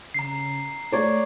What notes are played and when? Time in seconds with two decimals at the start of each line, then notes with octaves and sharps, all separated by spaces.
0.14 C#3 A#5 C7
0.92 A3 C#5 D5